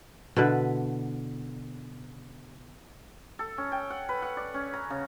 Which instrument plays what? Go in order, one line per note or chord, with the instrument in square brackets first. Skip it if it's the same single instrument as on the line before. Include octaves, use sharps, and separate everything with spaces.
[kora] B2 D3 E4 B4
[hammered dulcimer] A4
C#4
G5
F#5
B4
F#5
D5
C#4
A#5
C#3